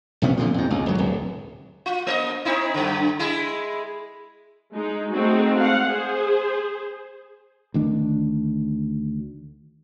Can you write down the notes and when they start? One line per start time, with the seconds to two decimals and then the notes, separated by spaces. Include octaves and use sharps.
0.22 A#1 C3 B3 C#4
0.37 A#2 D3 F3
0.54 F2 G#2
0.71 C#2
0.86 F#1 F#3
0.98 D1
1.86 F4
2.07 A#3 C5 D#5
2.45 C4 D#4 E4
2.74 F#2 D3
3.19 G#3 E4 G#4
4.74 G#3 D#4
5.11 G#3 A3 C4 D#4 F#4
5.60 F5 F#5
5.90 G#4 C5
7.74 D2 D#3 D4